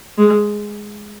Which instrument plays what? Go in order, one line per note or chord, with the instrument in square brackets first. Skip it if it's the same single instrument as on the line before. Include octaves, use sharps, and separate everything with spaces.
[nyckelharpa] G#3